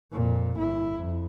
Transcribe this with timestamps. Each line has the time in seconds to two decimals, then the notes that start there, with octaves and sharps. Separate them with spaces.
0.12 F2 A#2
0.57 G1 E4
0.96 F2